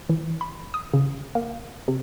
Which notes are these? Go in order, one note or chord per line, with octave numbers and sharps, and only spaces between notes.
E3
B5
D#6
C#3
A#3
C3